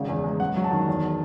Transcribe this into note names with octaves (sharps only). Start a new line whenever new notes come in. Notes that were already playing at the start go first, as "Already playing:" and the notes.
Already playing: G#1 C#3
E2
G#3
F#2 F#5
F#3
A5
D#3
E2